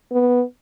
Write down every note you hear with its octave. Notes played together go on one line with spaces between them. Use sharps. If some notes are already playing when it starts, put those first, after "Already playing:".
B3